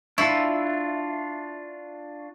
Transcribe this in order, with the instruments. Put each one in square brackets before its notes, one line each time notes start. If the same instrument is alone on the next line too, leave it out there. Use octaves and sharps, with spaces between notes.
[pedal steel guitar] D4 F4 [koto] E4 [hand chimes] C#6